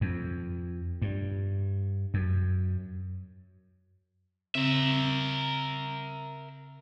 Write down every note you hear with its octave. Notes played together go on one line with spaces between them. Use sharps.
F2
G2
F#2
C#3 C4 A#4 E5